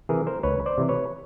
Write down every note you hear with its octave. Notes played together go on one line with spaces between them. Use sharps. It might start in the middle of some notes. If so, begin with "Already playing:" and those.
C3 E3 G#4 A#4
A#4 C5
C#2 B4 C#5
C5 D5
C3 E3
B4 C#5